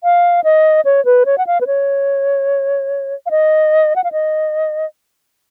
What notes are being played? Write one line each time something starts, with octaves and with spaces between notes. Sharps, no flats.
F5
D#5
C#5
B4
C#5
F#5
F5
B4
C#5
F5
D#5
F#5
F5
D#5